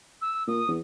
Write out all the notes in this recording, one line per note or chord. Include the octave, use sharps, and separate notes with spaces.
E6
A#2 D#6
E2